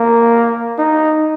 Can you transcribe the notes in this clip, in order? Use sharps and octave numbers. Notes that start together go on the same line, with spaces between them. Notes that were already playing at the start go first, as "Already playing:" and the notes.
Already playing: A#3
D#4